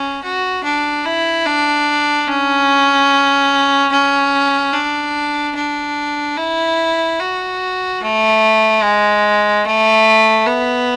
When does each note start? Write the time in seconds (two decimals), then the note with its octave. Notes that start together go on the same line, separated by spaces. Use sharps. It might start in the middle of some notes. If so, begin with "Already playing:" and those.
Already playing: C#4
0.23 F#4
0.64 D4
1.05 E4
1.46 D4
2.27 C#4
3.92 C#4
4.73 D4
5.55 D4
6.37 E4
7.19 F#4
8.01 A3
8.83 G#3
9.65 A3
10.46 B3